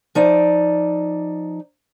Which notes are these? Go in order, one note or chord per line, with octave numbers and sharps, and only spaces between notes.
F3 D#4 D5 E5